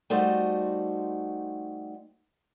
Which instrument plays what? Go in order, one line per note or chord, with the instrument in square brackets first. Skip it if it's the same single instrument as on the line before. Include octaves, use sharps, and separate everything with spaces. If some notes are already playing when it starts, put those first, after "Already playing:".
[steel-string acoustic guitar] G3 A3 D#4 F#4 C5